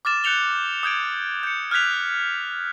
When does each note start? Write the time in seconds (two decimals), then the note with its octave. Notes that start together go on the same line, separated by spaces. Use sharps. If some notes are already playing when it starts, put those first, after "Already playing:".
0.05 D6 F6 A6 E7
0.24 F#6 G6 C#7 F7 G7
0.83 D#6 G6 G#6 D7
1.43 G6 C#7
1.71 F6 F#6 G#6 B6 F7